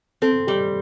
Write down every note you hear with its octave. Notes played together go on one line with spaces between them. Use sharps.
C4 A4
G3 G4